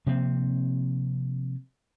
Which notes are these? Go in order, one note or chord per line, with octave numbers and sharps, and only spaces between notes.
C3 F3 A#3 C4